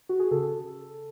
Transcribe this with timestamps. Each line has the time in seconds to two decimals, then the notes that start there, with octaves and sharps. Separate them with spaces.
0.09 F#4
0.20 G#4
0.31 C#3 A4